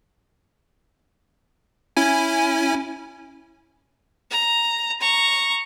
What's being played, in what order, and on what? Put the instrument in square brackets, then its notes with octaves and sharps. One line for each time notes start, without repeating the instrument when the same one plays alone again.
[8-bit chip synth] C#4 E4 G#5
[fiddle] A#5
A#5 C#6